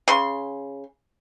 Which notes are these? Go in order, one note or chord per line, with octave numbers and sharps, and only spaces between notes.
C#3 C6